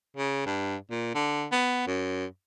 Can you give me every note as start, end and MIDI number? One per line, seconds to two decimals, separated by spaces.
0.17 0.42 49
0.46 0.76 43
0.91 1.14 46
1.14 1.45 50
1.52 1.83 59
1.87 2.25 42